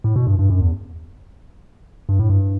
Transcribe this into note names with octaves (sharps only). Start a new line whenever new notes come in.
A2
B2
G2
G2
F#2
E2
G2
A2
G2